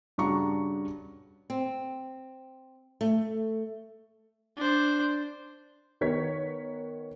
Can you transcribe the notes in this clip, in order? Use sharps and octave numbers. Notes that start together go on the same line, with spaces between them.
G2 C#3 D4 F#4 A#5 C#6
C4
A3
D4 C5
D#3 B3 A#4 C#5 G#6 B6